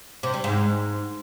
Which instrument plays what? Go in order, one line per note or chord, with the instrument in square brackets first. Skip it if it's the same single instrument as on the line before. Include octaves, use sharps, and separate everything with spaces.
[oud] C3
G3
G#2